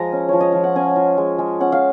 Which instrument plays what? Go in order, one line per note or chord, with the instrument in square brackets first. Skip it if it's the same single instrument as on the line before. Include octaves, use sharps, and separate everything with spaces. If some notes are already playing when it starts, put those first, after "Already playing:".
Already playing: [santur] F3 G#3 G#5 A#5
C#4
F3 C#5
D#5
F3 F5
F#5
C#4 G#5
F4
G#3
G#3
C#4 F#5
F5